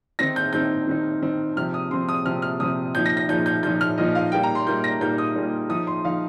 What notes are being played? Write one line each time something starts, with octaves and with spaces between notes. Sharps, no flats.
D#3 C4 D#4 A#6
G6
D#3 C4 D#4 G6
D#3 C4 D#4
D#3 C4 D#4
C3 F3 C4 F6
D#6
C3 F3 C4 C6
D#6
C3 F3 C4 F6
F6
C3 F3 C4 D#6
A#2 F3 D#4 G6
A#6
A#6
A#2 F3 D#4 G6
G6
A#2 F3 D#4 G6
F6
A#2 F3 D#4 D#5
F5
A#2 G3 A#3 D#4 G5
A#5
C6
A#2 G3 A#3 D#4 G6
A#6
A#2 G3 A#3 D#4 G6
D#6
A#2 G3 A#3 D#4
F3 D#4 D#6
C6
F3 D#4 F5